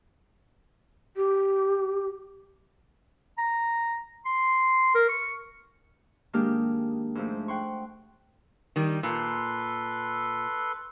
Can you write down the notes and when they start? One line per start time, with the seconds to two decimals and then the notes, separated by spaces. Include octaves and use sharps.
1.17 G4
3.38 A#5
4.25 C6
4.95 A#4
5.09 C#6
6.33 D#3 G#3 A#3 D4 G4 F6
7.15 G#2 F3 A3
7.48 F#5 G5 C6 C#6
8.76 D#3 G3
9.03 A#2 A4 B4 C6